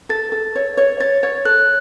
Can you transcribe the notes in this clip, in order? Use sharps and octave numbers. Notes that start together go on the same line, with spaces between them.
A4 A6
A4
C#5
C#5
C#5 A6
C#5
A4 F#6